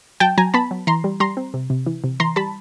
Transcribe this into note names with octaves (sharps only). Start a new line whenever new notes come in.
F#3 G5 A5
F#3 G#5 A#5
B3 A5 B5
F#3
E3 A#5 C6
G3
G3 A#5 C6
C4
C3
C3
E3
C3
E3 A#5 C6
G3 A5 B5